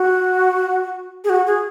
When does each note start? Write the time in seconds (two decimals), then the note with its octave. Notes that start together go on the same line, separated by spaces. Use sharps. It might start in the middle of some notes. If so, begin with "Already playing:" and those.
Already playing: F#4
1.24 G#4
1.30 F#4
1.47 G#4